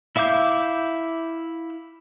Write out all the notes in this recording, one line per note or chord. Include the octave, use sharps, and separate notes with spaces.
E4 E5 F5 D6 G6